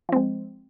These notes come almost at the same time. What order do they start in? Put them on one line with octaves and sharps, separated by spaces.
F3 C4 G#3